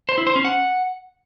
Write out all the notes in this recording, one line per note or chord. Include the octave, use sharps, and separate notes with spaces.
C5
E4
C5
C#4
F#5